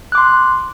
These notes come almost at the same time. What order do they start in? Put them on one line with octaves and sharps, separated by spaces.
F#6 D6 C6